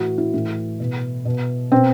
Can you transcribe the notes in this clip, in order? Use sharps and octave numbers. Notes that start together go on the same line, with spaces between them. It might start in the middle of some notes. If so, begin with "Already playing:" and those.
Already playing: A2 E3 F#4
E4
A2 E3
B2
B2
B2 C4